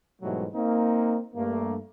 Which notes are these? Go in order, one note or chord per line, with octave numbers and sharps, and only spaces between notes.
G#2 B2 E3 F#3 G3 A3
A#3 C4 D#4
G2 A3 A#3